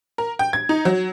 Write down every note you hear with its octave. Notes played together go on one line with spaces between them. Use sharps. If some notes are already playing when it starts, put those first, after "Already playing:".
A#4
G5
G#6
D#4
F#3